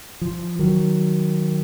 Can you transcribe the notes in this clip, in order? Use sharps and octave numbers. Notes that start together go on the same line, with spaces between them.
F3
D#3 F#3